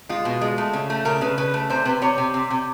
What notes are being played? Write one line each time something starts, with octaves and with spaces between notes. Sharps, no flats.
G#3 F4
B2
G#3
A3
C#3
A3
C#3 A#4
C#3 B4
C#3 B4
A3
C3 C5
C3 B4
C3 C#5
C3
C3
C3